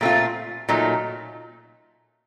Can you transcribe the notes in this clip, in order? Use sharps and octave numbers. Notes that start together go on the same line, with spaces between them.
A#2 A3 C4 F4
A#2 F#3 A3 D#4